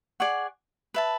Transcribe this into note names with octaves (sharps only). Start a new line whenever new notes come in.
G#4 D5 F#5 C#6
B4 E5 A5